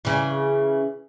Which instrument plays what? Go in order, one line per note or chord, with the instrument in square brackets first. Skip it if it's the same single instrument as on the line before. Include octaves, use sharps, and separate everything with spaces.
[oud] C#3 E3